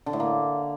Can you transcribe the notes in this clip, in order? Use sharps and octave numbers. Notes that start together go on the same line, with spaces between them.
D3
A2
A#3